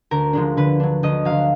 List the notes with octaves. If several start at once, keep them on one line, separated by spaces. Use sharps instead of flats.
D2 A#4
D3 F3 G#3 D4
D3 B4
F#3 D4
D2 D#5
D3 F#3 F5